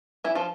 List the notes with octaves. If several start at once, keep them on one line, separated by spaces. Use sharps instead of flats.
E3 E4
F3 F4